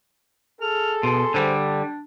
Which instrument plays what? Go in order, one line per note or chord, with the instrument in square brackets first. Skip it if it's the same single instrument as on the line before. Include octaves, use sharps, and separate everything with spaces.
[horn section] G#4 A4 [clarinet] F6
[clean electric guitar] B2 [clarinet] C6
[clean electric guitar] D3 G3 [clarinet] C5
[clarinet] D4